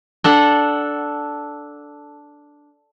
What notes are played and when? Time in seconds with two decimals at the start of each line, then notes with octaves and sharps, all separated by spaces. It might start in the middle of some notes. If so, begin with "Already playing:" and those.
0.24 D4 A4 F#5